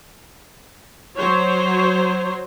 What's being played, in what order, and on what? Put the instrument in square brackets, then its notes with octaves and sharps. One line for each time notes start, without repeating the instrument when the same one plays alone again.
[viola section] F#3 C5 C#5